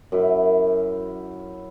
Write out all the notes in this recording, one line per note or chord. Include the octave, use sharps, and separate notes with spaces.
F#2 E4